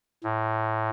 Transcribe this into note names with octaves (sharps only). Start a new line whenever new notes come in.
A2